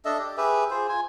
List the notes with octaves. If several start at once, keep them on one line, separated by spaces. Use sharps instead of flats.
D4 A4 D#5 E5
G4
G4 G#4 B4 E5
F4 G#4 C5
F4 G#5